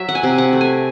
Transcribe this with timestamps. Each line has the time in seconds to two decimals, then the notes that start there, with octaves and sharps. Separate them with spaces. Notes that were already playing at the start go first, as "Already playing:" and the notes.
Already playing: F#3 E5
0.09 F#5
0.15 G#5
0.23 C3
0.38 F#5
0.53 A3
0.61 G#5